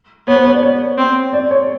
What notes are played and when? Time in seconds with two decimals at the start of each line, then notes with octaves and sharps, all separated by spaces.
0.28 B3 C#5
0.36 C5
0.45 C#5
0.54 D5
0.63 C#5
0.98 C4
1.33 D5
1.51 C#5